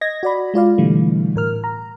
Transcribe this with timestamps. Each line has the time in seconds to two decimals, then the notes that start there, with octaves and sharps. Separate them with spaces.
0.01 D#5 G#6 A#6
0.23 F#4 D5 B5
0.54 G#3 F4 D5 F5
0.78 B2 D3 E3 G3 A3
1.36 A2 A#4 F6
1.64 A#5